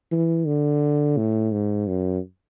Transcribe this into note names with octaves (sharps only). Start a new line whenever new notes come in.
E3
D3
A2
G#2
F#2